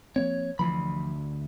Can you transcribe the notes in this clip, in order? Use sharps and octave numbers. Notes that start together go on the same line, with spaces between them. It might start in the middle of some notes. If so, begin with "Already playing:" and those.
F3 A#3 C4 C#5
D2 E3 F3 B5